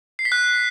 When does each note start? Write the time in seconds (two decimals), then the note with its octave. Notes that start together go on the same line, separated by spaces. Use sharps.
0.19 C7
0.25 B6
0.32 F#6